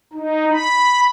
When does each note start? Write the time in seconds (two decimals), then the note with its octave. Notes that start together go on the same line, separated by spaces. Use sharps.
0.13 D#4
0.52 B5